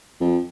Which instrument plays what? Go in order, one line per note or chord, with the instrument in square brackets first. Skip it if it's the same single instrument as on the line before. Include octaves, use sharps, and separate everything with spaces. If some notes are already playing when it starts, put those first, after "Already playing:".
[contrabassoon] F2